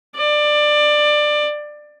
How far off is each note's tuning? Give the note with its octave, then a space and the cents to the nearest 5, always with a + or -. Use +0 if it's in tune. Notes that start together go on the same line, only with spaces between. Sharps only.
D5 +20